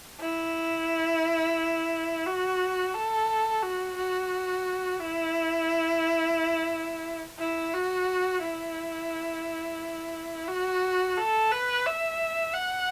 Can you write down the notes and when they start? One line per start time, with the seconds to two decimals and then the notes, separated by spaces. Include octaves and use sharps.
0.20 E4
2.26 F#4
2.95 A4
3.62 F#4
3.97 F#4
5.00 E4
7.39 E4
7.75 F#4
8.43 E4
10.48 F#4
11.17 A4
11.52 B4
11.86 E5
12.54 F#5